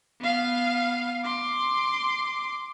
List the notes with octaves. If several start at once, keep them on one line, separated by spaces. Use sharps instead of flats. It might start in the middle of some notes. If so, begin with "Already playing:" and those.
B3 F5
C6 D6